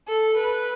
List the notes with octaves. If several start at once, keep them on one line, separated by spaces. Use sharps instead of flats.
A4
B4